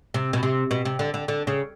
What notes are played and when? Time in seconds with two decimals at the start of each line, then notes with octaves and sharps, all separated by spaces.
0.14 C3
0.33 B2
0.43 C3
0.71 B2
0.85 C3
0.99 D3
1.14 D3
1.28 D3
1.47 C#3